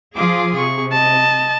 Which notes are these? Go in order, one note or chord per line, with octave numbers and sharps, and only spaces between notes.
F3 F4 G#4 D6
C3 G#4 C#6
D#5 A5